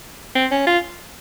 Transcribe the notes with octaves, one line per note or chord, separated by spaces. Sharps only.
C4
C#4
F4